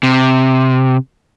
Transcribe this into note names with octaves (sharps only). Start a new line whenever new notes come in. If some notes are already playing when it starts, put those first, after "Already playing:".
C3